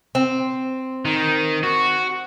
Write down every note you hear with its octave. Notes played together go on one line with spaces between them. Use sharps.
C4
D#3
F#4